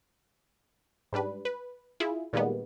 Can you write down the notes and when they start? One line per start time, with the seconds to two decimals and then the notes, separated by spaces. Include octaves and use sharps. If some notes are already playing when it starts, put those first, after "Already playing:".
1.13 G#2 G3 D4 B4
1.45 B4
2.00 E4 F4 G#4
2.33 A#2 D#3 G3 G#3 A#3 B3